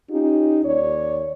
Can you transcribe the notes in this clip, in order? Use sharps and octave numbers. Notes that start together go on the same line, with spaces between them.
C#4 D#4 F4 G4
D#2 C#5 D5